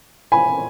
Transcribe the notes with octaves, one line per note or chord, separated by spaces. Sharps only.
G#5 B5